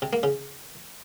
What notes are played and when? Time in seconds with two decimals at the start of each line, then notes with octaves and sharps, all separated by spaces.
0.02 C3
0.13 A#3
0.23 C#3